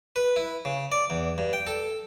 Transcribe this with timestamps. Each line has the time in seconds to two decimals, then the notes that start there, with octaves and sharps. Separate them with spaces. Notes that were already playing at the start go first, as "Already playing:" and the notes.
0.16 B4
0.36 E4
0.65 C#3
0.92 D5
1.10 E2
1.38 G2
1.53 G5
1.67 A4